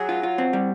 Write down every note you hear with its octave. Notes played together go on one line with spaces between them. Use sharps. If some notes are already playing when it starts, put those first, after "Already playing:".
Already playing: F#3 G#4
F4
F4
C4
G3